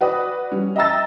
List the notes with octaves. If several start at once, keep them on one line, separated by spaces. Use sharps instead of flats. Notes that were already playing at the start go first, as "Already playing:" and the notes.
F#4 B4 D5 D#6
G3 C#4
D#5 E5 G5 A#5 E6 A6